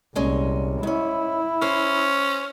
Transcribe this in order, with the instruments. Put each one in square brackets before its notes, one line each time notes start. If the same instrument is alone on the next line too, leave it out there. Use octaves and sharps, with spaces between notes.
[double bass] C2 [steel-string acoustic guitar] A#2 G#3 C#4
[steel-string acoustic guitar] G#2 C#4 [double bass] E4
[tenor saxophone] C#4 [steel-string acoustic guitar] C5